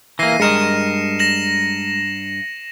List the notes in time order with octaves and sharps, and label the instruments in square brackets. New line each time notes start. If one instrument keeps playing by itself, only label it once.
[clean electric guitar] E3 A#3 [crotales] A#6 C7 D#7
[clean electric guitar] G2 A#4 D#5 [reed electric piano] G#3 [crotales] A#6 C#7 E7
[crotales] A#6 E7 F#7